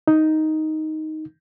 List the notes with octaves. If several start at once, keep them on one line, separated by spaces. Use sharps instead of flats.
D#4